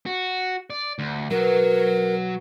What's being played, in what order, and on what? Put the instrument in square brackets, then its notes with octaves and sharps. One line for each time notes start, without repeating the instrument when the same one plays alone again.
[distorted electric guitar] F#4
D5
D2
[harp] B2 [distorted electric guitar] F#3 [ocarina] A#4